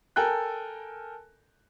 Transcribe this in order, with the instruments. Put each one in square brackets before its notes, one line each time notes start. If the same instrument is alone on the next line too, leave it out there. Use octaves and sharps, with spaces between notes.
[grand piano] A4 A#4 G5 G#5 F#6